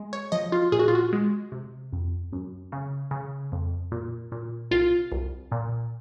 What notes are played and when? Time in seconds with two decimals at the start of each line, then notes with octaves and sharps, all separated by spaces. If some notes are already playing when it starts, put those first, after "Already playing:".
Already playing: G#3
0.13 C#5
0.32 F3 D#5
0.52 F4
0.72 A#2 G#4
0.79 F#4
0.88 F4
0.95 F#4
1.13 G#3
1.52 C3
1.93 F2
2.32 F#2
2.72 C#3
3.11 C#3
3.52 F2
3.92 A#2
4.32 A#2
4.71 C2 F4
5.12 C2
5.52 A#2